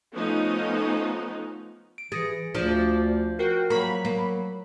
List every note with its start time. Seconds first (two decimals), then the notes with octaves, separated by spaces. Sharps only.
0.14 F3 A3 B3 C#4 D#4
1.98 D7
2.12 E3 G#4 A6 A#6 C#7
2.55 D2 F3 D4 D5
3.39 F#4 A#4 G5 C7
3.70 F#3 A#3 A#5 B5 C#6
4.05 A#3